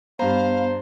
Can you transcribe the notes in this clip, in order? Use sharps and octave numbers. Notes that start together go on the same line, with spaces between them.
G2 B3 C5 F5 A#5